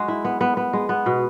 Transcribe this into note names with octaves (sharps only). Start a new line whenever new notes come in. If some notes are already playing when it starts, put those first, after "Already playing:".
Already playing: G#3 F#4
E4
B3
B3
B3
G#3
B3
B2